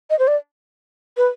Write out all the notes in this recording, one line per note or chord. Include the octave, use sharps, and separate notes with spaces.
D#5
C5
D5
B4